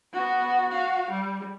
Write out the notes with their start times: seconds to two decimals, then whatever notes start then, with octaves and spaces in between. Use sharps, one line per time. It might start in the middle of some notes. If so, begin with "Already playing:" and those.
0.13 B3 F#4
0.69 F#4 F5
1.10 G3